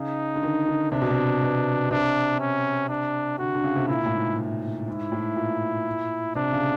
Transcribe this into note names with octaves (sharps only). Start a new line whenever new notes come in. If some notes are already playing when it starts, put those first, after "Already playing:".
Already playing: C#3 D#4
D3
D#3
D3
C3 D4
B2
C3
B2
C3 D4
C#4
D4
D3 F#4
D3
C#3
C3
A#2 E4
A2
G#2
G#2 E4
A2
A#2
C3 D4
C#3